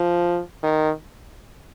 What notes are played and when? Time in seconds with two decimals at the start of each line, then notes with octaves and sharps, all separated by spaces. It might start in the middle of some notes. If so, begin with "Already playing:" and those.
Already playing: F3
0.63 D#3